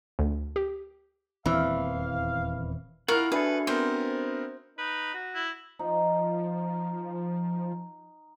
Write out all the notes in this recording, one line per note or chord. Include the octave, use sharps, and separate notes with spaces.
D2
G4
D#1 E2 E3 C4 F5
E4 F4 A#4 F#5 C#6 F6
D4 F#4 G#4 A4 B4 E5
B3 C4 A#4 C5
D#4 B4
F#4
E4
F3 D#4